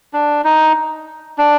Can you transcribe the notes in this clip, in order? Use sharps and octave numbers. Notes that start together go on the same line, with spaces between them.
D4
D#4
D4